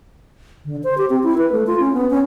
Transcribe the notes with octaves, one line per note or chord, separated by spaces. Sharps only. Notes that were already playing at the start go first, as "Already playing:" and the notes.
D3
C5
G4
C4
E4
B4
A3
F4
C#4
B3
C#4